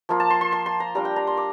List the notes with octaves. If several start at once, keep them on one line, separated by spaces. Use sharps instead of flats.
F3 A#3 F4
A5
C6
C6
C6
C6
A#5
G3 D4 F4 A#5
G5
A#5
C6
D6